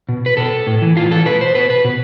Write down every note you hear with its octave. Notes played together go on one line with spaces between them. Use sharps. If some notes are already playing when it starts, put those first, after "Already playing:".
B2
B4
B2 A4
A2
E3
A2 F4
E3 A4
B2 B4
C5
B2 B4
B4
B2